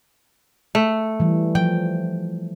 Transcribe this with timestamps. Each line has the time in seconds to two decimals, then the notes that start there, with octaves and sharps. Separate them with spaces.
0.75 A3
1.20 E3 G3
1.55 F3 G5